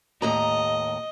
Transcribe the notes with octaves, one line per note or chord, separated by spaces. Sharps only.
D#2 A2 D#5 A#5